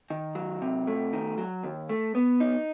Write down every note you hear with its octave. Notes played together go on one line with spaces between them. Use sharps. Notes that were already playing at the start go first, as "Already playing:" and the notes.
D#3
F#3
C3
A3
D#3
F#3
D#2
A3
B3
D#4